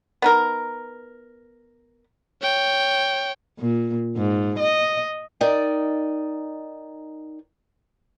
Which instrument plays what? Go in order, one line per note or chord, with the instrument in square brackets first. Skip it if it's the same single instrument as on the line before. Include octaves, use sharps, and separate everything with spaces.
[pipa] B3 D#4 A#4
[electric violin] C#5 G5
[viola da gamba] A#2
G#2
D#5
[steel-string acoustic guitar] D#4 A#4 D5 D#5 G5